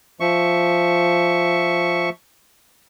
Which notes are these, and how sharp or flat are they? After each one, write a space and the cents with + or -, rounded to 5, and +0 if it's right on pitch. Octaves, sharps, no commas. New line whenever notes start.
F3 +0 E5 +0 C#6 +0